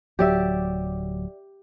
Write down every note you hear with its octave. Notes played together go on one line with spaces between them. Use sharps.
D1 F#3 G4 D5 E5